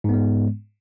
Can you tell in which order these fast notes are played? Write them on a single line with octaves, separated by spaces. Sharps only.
G#2 B3 G#3